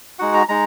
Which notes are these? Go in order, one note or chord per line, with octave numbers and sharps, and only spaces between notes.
G#3 D#4 F#4 F#5
A#5
G#3 D#4 A#5